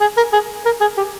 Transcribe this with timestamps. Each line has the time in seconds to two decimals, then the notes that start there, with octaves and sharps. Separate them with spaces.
0.01 G#4
0.17 A#4
0.33 G#4
0.65 A#4
0.81 G#4
0.97 G4